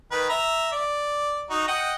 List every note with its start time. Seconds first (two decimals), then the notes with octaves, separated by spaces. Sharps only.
0.12 D#3 B4
0.30 E5 A#5
0.72 D5
1.50 D#4 F#4
1.68 D#5 F#5 G5